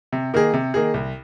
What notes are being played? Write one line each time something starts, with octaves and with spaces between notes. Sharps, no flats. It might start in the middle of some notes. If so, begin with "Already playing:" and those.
C3
D#3 A#3 G#4
C3
D#3 A#3 G#4
C2